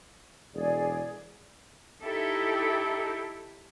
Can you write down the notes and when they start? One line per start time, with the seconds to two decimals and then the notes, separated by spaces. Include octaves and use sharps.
0.54 E1 G#4 D5
2.03 D#4 E4 G4 A4